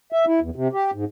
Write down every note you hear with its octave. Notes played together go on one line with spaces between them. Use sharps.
E5
E4
E2
C3
G4
G#2